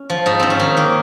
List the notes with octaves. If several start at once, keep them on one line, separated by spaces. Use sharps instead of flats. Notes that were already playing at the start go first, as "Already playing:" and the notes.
Already playing: C#4
F3
G#2 D#4
G#2 C4
C#4
D#3 D#4
D#3 A#3